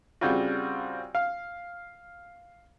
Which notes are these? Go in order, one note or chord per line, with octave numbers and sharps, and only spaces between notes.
C#3 G3 C4 F4 F#4
F5